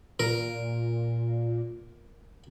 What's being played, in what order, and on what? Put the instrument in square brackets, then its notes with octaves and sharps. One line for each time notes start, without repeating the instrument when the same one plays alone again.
[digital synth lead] A#2 [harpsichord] A#4